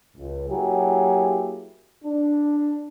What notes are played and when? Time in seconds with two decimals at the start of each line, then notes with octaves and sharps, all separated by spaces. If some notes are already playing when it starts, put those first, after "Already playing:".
0.17 C#2
0.49 F#3 A#3 E4 G4 G#4
2.05 D4